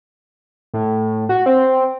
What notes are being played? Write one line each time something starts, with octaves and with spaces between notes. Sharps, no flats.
A2
F#4
C4